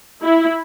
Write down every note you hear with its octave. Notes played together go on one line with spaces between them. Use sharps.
E4